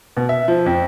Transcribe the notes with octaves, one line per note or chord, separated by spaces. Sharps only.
B2
E5
F3
F2